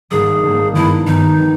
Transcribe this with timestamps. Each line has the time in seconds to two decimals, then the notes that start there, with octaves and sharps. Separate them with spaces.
0.11 G#1 G#2 G3 A#3 G#4
0.44 G#1 G#2 G3 A#3
0.73 G2 D#3 G#3 B3 E4
1.07 G2 D#3 G#3 B3 D#4
1.39 G3 B3